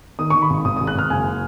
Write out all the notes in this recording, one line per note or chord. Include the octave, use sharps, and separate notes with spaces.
D#3 D#6
C#6
D#3
B5
G#1
G#1 D#6
D#6
G#1
F#6
G#1 F6
F#1 G#5